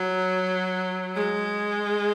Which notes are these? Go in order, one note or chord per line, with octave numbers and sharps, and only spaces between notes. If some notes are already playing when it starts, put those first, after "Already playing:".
Already playing: F#3
G#3